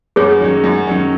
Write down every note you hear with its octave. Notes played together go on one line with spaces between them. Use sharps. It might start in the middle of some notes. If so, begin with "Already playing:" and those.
F#2 G#4 C#5
D#3 F#3 C#4
F#2
D#3 F#3 C#4